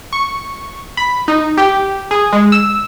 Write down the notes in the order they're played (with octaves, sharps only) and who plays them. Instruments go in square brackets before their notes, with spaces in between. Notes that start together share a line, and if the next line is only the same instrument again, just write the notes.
[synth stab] C#6
B5
D#4
G4
G#4
G#3
E6